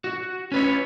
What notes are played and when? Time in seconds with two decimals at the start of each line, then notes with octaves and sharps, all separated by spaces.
0.04 F#4
0.52 C#4 B4 C#5